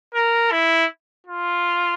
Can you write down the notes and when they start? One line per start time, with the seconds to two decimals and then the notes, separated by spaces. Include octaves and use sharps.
0.14 A#4
0.51 E4
1.27 F4